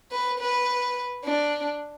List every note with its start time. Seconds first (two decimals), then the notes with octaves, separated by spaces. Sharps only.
0.12 B4
0.39 B4
1.24 D4